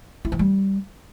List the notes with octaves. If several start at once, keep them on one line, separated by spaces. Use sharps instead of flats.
E4
E3
G3